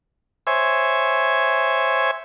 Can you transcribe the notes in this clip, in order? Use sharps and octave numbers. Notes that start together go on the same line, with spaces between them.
C5 C#5 E5 G#5